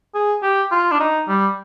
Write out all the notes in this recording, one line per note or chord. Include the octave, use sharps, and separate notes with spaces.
G#4
G4
F4
D4
D#4
G3